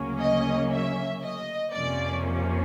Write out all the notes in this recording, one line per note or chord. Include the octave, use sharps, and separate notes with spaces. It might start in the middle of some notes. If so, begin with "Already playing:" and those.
Already playing: D2 C#3 F#3 A#3 C#4
D#5
E5
D#5
F2 C3 F3 A#3 C#4 D5